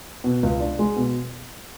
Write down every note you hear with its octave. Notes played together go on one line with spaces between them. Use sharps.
B2
C#2
D4
G#3
B2